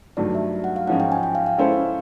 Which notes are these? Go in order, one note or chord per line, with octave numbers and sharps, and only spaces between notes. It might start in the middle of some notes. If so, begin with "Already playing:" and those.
G2 D#3 F#3 A3 D5
E5
F#5
F5
G#2 F3 G#3 C#4 F#5
G5
G#5
G5
F5
F5
G#3 C#4 E4 A4 C5